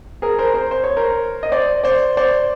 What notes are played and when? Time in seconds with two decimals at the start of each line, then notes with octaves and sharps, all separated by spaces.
0.22 G#4 A#4
0.39 A#4 C5
0.54 A#4 C5
0.71 C5
0.84 C#5
0.97 A#4 C5
1.43 D#5
1.52 C5 D5
1.84 C5 D5
2.17 C5 D5